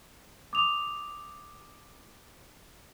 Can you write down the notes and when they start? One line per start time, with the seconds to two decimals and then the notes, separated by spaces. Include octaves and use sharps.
0.53 D6 D#6 F7